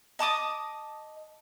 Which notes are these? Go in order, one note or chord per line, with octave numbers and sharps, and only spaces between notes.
D#5 A5 D6 D#6